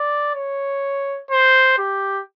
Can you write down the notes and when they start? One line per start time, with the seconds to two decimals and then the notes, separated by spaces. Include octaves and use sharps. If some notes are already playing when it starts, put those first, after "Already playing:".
Already playing: D5
0.35 C#5
1.31 C5
1.78 G4